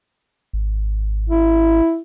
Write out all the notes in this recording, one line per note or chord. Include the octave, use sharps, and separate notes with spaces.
G#1
E4